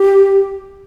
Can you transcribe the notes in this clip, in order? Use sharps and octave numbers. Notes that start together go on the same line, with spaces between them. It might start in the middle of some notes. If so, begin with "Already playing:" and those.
Already playing: G4